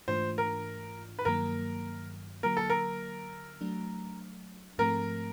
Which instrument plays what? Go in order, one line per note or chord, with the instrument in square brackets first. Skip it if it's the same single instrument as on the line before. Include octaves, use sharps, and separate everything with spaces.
[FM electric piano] G#2 E3 A3 D4 F4 [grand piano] C5
[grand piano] A#4
B4
[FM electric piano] G2 D#3 F#3 A#3 [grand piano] A#4
[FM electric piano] D3 F#3 A#3 [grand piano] A#4
[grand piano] A4
A#4
[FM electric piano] F#3 A3 D4
[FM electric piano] G#2 F3 A3 C4 [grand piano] A#4